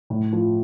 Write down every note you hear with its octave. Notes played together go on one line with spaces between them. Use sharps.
A2
F3